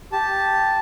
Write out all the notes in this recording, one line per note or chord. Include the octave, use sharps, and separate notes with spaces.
G4 A5